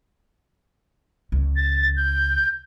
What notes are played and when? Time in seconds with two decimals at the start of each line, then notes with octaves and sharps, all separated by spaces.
1.32 C#2
1.56 A6
1.97 G6